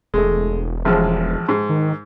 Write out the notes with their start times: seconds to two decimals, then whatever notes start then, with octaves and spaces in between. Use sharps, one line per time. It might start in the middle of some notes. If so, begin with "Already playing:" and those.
0.14 E1 G#3 A3
0.85 A1 F3 G#3
1.49 G#2
1.70 D#3